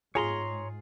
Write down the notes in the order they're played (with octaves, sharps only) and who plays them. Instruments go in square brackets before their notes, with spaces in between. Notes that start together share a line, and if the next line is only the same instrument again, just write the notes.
[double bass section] G#2 [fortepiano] F4 G#4 [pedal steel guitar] C#5 A#5 C6